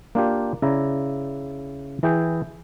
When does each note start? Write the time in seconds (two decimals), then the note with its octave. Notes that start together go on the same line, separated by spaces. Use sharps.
0.15 A#3 D4 F4 G4
0.62 C#3 E4 D5 A#5
2.03 E3 E4 G#4 G5